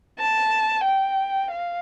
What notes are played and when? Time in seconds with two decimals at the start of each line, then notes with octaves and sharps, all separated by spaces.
0.19 A5
0.85 G5
1.51 F5